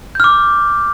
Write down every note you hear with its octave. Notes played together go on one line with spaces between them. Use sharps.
D6 F6 G6